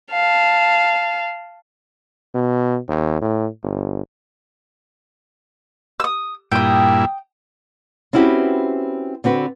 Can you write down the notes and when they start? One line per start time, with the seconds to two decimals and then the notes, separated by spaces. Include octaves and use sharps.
0.12 F5 A5
2.35 B2
2.88 D#2
3.22 A2
3.63 G1
6.00 D#6 E6
6.52 G2 A#2 E4 G5 D#6
8.13 C4 C#4 E4 F#4 G4 B4
9.24 D3 C4 F#4 B4